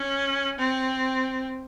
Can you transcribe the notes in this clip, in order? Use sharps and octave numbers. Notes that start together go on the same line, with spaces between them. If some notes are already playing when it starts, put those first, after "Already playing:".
Already playing: C#4
C4